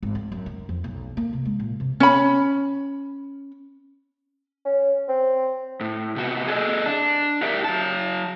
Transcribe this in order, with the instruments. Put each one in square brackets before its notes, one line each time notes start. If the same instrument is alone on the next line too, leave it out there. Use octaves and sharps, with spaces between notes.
[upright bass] G#1
C4
F#2
D#3
F2
B1
A#3
C3
G#3
A#2
C3
[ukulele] C#4 B5
[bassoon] C#4
C4
[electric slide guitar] A2
C3 B3 F#4
G#4 A4 C#5 D#5
D4
G4 A#4 D5 E5
F#3 A5